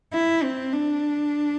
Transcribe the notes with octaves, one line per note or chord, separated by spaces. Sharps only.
E4
C4
D4